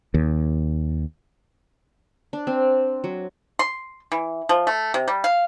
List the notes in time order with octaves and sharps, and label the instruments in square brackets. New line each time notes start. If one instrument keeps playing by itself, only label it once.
[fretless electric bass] D#2
[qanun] D4
C4
F#3
[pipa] C6
E3
F3
A3
C3
G3
F5